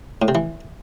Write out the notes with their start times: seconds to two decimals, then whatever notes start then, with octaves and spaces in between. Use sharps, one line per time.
0.22 A2
0.28 C3
0.35 E3